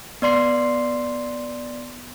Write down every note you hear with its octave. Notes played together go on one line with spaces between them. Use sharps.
B3 D5 C6 C7